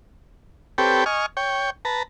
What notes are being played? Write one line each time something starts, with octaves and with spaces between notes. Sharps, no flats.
C4 G4 A4 B4 C#5 G5
D#5 G#5 C#6 F6
C#5 G5
B4 A5 A#5